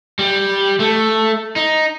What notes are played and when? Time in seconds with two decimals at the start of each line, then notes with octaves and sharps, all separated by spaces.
0.19 G3
0.80 A3
1.56 D#4